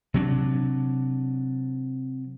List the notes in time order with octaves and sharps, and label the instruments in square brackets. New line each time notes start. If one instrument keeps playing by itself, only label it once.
[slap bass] C3 F#3 C#4 D4